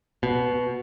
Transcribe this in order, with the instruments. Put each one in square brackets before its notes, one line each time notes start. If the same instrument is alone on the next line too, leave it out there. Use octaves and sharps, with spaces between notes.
[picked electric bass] B2